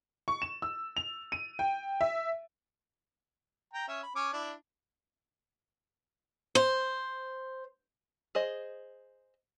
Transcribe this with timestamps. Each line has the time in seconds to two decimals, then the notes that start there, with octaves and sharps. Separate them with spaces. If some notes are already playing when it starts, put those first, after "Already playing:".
0.28 C#6
0.42 E7
0.62 E6
0.97 F7
1.32 D#7
1.59 G5
2.01 E5
3.74 G5 A#5
3.88 C#4 E5
4.03 B5
4.16 C#4 D6
4.33 D4 E4
6.55 C5
8.35 G#4 C5 D#5